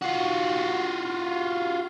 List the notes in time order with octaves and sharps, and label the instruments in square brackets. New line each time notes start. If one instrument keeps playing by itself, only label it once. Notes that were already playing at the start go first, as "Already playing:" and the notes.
[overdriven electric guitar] F4 F#4